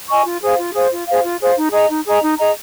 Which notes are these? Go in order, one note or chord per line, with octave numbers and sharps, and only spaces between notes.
D#5 G#5 C#6
F4
G#4 C5 F5
F4
G#4 C5 F5
F4
G#4 C5 F5
F4
G#4 C5 F5
D#4
G#4 D#5 A#5
D#4
G#4 D#5 A#5
D#4
G#4 D#5 A#5